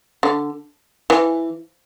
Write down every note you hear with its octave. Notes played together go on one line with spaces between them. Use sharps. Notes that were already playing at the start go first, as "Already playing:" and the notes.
D3
E3